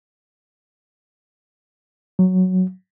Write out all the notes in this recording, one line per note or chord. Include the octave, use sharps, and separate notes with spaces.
F#3